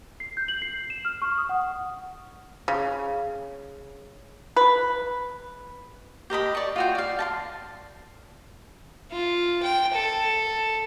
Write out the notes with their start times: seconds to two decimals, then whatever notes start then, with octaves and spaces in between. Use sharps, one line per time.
0.20 C7
0.37 G6
0.48 F#7
0.62 C7
0.77 C7
0.90 E7
1.05 F6
1.22 C#6
1.38 D#6
1.49 F#5
2.68 C#3
4.56 B4
6.30 G4 A#4 D#5 B5
6.55 D5 C#6
6.76 F4 F#4 G5
6.95 D5 F5
7.19 A5 A#5 C6
9.11 F4
9.62 G5
9.94 A4